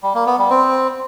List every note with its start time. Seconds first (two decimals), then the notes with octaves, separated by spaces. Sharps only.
0.03 G3
0.15 A#3
0.27 B3
0.38 G3
0.50 C4